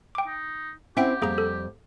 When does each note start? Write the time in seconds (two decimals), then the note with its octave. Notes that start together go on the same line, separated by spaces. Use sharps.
0.15 G5 D6
0.27 D#4
0.97 C4 C#4 E4 G4 E5 F#5 G5
1.22 F2 G3 A#3 G#4 A#5
1.38 A4